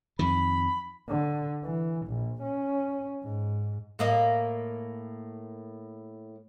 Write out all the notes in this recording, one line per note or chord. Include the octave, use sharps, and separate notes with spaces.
F2 D#3 B5
D3
E3
A#1
C#4
G#2
A2 A#3 D#5